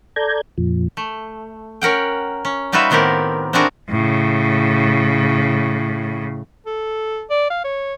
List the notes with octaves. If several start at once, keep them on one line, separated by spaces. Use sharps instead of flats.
A4 D5 A#5 G6 G#6
F2 A#2 F3
A3
C#4 A#4 F#5 G5
C#4
G3 D#4 F4 F#4 B4 E5
A2 D#3 B3 C4 G4 A#4
C4 D4 E4 F#4 G#4 A#4
A2 C#3
A4
D5
F5
C#5